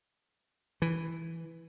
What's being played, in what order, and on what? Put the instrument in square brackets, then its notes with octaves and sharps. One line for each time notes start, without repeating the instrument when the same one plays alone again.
[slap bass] E3